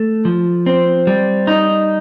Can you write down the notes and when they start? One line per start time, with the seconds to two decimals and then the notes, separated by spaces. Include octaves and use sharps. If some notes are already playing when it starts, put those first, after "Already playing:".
Already playing: A3
0.25 F3
0.66 C4
1.07 G3
1.47 D#4